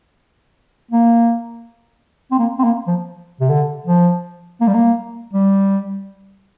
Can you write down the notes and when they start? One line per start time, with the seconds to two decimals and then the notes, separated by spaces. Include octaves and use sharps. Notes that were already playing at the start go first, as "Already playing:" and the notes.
0.91 A#3
2.31 C4
2.39 A#3
2.59 C4
2.63 A#3
2.87 F3
3.41 C3
3.50 D3
3.87 F3
4.61 A#3
4.67 G3
4.74 A#3
5.33 G3